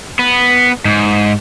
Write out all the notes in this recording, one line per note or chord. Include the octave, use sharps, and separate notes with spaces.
B3
G#2